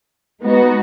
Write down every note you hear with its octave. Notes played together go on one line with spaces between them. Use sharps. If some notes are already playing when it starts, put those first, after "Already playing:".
G#3 B3 D#4 F#4